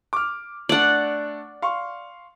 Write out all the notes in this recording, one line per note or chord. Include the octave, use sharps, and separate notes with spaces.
D6 F6
A3 D4 D5 F#5
F5 C6 C#6